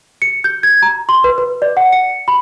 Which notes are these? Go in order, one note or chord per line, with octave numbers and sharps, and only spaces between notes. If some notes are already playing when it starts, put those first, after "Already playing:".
C#7
G6
G#6
A#5
C6
B4
B4
D5
F#5
C#7
B5